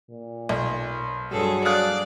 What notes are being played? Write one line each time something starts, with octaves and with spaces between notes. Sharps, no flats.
A#2
B1
G2 F#3 G#4 A4
D5 F5 D#6 F#6